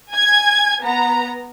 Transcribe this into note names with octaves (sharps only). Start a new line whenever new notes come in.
G#5 G#6
B3 A#5